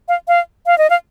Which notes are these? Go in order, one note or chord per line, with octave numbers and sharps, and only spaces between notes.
F5
F5
F5
D#5
F5